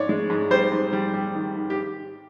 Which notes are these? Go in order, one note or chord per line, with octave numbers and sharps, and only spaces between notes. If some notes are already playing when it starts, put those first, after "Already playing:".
Already playing: G#2 C#5 D5
G#3
G#2
G3 C5
G#2
G3
G3
D#3
G#2
G4